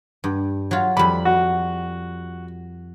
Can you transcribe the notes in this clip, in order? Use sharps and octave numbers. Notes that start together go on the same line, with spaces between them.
G2
F#3 F4
F2 G3 B5
F#4